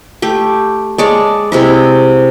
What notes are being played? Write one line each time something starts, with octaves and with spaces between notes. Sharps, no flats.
A3 G4
G#3 C#5 D5 A5
C3 G#3 E4